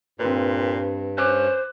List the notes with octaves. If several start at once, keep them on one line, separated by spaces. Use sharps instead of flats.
G2 A#2 C4 B4
C#4 C5 D6 F#6